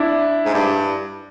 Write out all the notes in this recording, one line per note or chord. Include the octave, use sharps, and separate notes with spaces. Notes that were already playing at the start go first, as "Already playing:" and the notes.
Already playing: D4 E4
G#2
G2